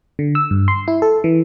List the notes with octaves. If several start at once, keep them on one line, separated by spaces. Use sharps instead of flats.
D3
E6
G2
C6
E4
A4
E3